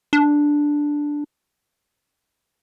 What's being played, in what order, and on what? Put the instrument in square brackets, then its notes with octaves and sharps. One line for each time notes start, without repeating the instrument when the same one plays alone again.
[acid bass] D4